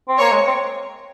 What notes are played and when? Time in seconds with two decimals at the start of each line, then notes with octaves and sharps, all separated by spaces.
0.09 C4
0.18 A#3 C#5
0.32 G#3
0.47 C4